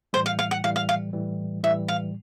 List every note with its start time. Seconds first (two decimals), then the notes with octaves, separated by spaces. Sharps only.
0.13 A2 E3 G3 C5
0.26 F5
0.39 F5
0.51 F#5
0.64 A2 E3 G3 F5
0.76 F5
0.89 F5
1.13 A2 E3 G3
1.63 A2 E3 G3 E5
1.88 F5